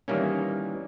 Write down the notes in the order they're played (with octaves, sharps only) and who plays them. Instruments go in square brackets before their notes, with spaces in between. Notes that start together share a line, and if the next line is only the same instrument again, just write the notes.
[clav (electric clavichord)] D#3 E3 G3 A#3 C#4